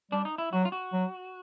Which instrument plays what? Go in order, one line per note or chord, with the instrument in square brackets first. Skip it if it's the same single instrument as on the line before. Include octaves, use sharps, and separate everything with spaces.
[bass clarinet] G3 [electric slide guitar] D4
[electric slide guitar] D#4
E4
[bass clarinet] F#3 [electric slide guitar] F#4
[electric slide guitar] F4
F#4
[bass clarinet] F#3